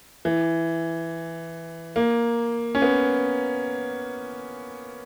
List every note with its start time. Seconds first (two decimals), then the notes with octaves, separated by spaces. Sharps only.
0.25 E3
1.96 A#3
2.75 C#4
2.82 B3